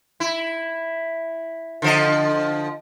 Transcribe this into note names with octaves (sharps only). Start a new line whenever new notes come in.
E4
D3 F3 D#5